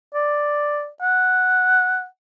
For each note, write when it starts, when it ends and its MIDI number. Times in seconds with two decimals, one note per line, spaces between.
0.14 0.87 74
1.02 2.05 78